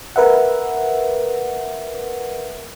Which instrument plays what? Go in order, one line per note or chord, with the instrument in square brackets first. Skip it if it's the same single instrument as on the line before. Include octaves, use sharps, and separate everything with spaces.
[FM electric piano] A#4 B4 E5 F#5